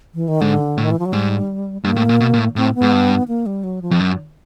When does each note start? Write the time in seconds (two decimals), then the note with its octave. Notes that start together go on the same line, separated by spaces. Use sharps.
0.15 E3
0.28 D#3
0.41 G#2 D3
0.78 A2
0.84 D#3
0.91 E3
0.99 F3
1.06 F#3
1.13 G#2 G3
1.84 G2 A#3
1.96 A2
2.09 A#2
2.20 B2
2.33 A#2
2.38 A2
2.56 A2 C4
2.75 B3
2.82 G#2
2.93 G2
3.28 A#3
3.46 G3
3.64 F#3
3.82 F3
3.91 F2
4.00 F#2